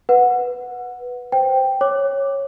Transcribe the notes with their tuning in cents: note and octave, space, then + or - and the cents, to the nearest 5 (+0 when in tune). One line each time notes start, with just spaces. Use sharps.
B4 +0 F#5 -15
C5 -5 G5 +0
C#5 -10 D6 +0